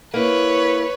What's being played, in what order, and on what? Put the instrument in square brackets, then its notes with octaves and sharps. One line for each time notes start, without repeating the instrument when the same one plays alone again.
[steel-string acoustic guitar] A#3 E4 [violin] B4 C#5